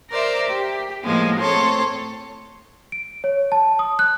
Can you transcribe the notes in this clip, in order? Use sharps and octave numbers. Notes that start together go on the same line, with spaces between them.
A#4 C5 D5 E5
G4
A2 F3 G#3 A#3 B3
A2 C4 A4 C#5 C6
D7
C#5
A5
D#6
F#6